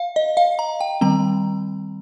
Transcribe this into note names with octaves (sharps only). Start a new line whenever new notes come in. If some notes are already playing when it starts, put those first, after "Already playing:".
Already playing: F5
D#5
F5
A#5
G5
D#3 G3 C4 A#5